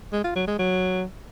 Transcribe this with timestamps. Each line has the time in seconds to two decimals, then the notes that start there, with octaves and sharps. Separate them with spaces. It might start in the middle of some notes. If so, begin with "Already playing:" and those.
0.13 G#3
0.24 F4
0.36 F#3
0.47 G#3
0.59 F#3